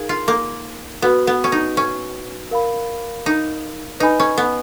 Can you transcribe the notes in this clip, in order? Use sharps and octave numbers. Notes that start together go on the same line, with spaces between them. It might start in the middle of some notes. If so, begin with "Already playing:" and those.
Already playing: D#4 G#4 A#4 F5
F4
A#3
B3 F#4 B4 F#5
B3
C#4
D#4
C#4
A#4 F5 B5
D#4
D#4 B4 D#5 G#5 B5
C#4
B3